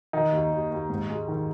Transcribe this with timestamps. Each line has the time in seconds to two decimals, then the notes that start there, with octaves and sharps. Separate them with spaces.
0.13 D#3 D#4
0.32 D#2
0.52 D#2
0.71 D#2
0.90 G#2
1.09 G#3
1.28 D#3